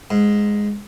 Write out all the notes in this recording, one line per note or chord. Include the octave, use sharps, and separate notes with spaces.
G#2